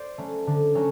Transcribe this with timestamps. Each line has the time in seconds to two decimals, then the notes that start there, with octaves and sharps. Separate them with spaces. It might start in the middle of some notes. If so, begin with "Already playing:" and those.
Already playing: C5 D5
0.18 F#3 A3 C#4
0.47 D3
0.75 F#3 A3 C#4